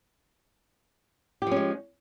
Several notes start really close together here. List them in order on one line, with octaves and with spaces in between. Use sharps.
G4 F3 C#4 G#3